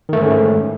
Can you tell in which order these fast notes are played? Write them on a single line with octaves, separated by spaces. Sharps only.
D#3 A3 G#2 C#4